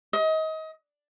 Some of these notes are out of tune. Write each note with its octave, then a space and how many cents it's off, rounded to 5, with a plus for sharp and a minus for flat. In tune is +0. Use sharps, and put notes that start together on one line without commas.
D#5 +30